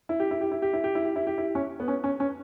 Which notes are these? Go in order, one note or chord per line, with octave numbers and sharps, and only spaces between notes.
E4
G4
E4
G4
E4
G4
E4
G4
E4
G4
E4
G4
E4
C#4
B3
C#4
C#4
C#4